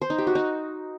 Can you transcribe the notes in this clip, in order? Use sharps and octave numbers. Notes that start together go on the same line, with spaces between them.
C5
D#4
G4
F#4
D#4